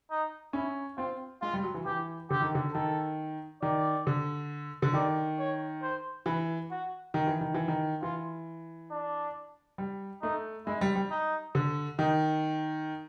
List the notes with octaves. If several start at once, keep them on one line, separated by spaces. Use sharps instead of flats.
D#4
C#4 E4
C4 F4
G#3 F4
G3
F#3
E3
E3 G4
D3 G4
D#3
D3
D#3 A4
D#3 D5
D3
D3
D#3 D5
C#5
C5
E3 B4
F#4
D#3
E3
D#3
E3
D#3
E3 F4
D4
G3
A3 D#4
G#3 E4
G3
G3
D#4
D3
D#3 D#4